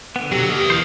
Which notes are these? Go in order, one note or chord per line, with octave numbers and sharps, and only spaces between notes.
D3 B3 F#5
B2 F#3 G4
A#3 G4 D#5
E3 C5 F5